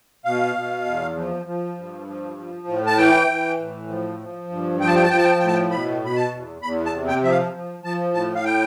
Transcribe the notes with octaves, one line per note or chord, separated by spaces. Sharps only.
B2 F5
B2
E2
F3
F3
G2
F3
F3
A2
A5
E3 G5
E3
A2
F3
F3
G2
F3 G5
A5
G5
A5
F3 G5
A5
G5
A5
A2 G5
A5
G5
B2 B5
B2 B5
A5
E2
E2 B5
A5
C3
G5
F3 E5
F5
F3
F3 A5
A2 A5
F5
G5